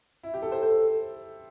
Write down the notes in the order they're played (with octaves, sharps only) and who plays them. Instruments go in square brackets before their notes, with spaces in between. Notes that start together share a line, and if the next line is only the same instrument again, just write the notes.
[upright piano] E4
G4
A4
C5
[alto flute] A4 [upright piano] C5